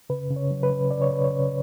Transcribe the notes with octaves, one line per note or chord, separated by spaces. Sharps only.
C#3 B4
C#3
C#5
F#3
B4
C#3
C#3 D5
C#5
C#3 B4
C#5
C#3